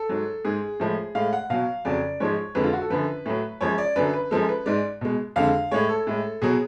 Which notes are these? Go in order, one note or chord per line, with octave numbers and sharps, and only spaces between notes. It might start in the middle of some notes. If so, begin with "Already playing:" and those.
Already playing: A4
G#2 F#3
G#2 G#3 G#4
A2 F3 G#3
A2 G#3 F5
F#5
B2 F#3 F5
F2 C#3 F#3 D5
G#2 F3 G#3 C#5
F2 D3 G#3 B4
F4
F#4
A4
F#2 D3 F3 B4
A2 F#3
F#2 F3 G#3 C#5
D5
F#2 D3 F#3 B4
B4
F#2 F3 G#3 A4
B4
G#2 G#3 D5
B2 G#3
F2 D3 G#3 F5
A2 G#3 C#5
A4
A2 G#3
B2 F#3 G#4